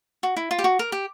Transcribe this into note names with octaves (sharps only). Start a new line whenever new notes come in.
F#4
E4
F4
G4
F#4
A#4
G4